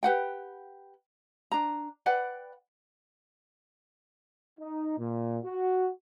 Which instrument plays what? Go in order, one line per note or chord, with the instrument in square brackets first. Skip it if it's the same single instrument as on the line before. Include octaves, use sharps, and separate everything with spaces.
[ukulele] G4 B4 F#5 G5
D4 A#5
B4 D5 F#5 G5
[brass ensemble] D#4
A#2
F#4